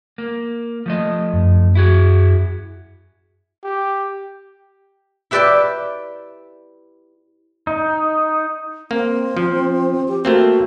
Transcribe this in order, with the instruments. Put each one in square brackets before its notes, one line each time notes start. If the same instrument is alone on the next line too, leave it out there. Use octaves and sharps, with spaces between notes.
[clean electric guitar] A#3
F3 A3 D#5
[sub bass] F#2
[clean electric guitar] E4 F#4 G#4
[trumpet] G4
[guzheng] E4 G4 B4 D5 E5 G5
[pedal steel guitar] D#4
[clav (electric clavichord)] A#3 [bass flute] C4
[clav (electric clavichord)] F3
[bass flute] G4
[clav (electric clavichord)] A3 A#3 C4 [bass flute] F#4